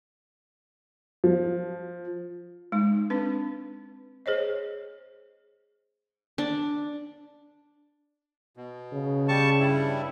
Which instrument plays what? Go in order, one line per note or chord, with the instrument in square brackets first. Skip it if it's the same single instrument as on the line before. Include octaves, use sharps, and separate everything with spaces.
[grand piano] F3
[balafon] G#3 D#4
C4 D4 B4
G#4 C5 C#5 D#5
[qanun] D4
[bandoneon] B2
[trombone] C#3
[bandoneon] G3 A5 C#6
G2 G3 E4